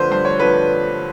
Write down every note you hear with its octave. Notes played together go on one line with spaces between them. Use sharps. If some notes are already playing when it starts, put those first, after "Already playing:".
Already playing: D3 F3 B4 C5
G2 C5
C#5
D3 F3 B4